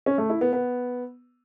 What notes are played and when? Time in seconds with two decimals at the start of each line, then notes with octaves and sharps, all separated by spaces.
0.06 C#4
0.18 A3
0.30 E4
0.41 B3
0.53 B3